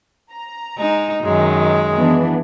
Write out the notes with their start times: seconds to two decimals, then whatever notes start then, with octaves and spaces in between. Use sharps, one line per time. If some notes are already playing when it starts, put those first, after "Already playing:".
0.32 A#5
0.77 G#3 D#4
1.24 F#2 D#3 G#3
1.98 E3 B3 D4